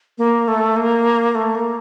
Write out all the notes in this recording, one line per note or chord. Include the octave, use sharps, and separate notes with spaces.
A#3
A3
A#3
A3
A#3